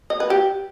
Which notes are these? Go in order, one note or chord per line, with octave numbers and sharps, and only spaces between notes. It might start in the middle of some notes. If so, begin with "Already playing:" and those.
D#5
B4
G4